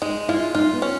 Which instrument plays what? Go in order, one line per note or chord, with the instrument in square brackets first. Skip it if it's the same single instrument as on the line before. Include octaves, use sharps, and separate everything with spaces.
[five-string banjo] G#3 [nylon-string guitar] D#4
[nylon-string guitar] E4 [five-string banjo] F4
[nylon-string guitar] D#4 [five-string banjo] F4
[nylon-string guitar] B3
[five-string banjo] C#4